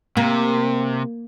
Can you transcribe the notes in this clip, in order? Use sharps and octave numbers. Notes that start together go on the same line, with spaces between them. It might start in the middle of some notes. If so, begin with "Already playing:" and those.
C3 A#3